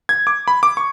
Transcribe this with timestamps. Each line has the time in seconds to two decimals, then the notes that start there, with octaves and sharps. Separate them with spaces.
0.09 G#6
0.27 D6
0.48 B5
0.63 D6
0.77 C#6